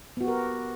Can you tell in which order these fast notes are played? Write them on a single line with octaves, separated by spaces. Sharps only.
B3 F#4 G4 A#4